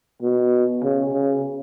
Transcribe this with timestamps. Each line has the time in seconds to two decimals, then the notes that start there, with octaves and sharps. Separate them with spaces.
0.22 B2
0.83 C#3
1.13 C#3